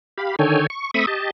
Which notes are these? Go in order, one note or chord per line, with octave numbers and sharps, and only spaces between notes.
G4 F5 B5
D3 D#3 A4 C#5 G5 G#5
C#6
A3 C4 E5 B5 C#6 D#6
G4 D#5 A5